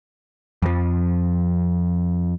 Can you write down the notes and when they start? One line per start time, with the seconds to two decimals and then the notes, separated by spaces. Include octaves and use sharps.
0.62 F2 F3